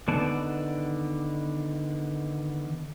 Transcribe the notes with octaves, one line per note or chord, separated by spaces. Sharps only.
D3 D#3 B3 D5 A5